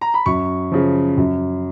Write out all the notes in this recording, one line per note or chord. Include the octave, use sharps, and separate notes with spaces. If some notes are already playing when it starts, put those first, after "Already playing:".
A#5
B5
F#2 C#6
C#3 F3
F#2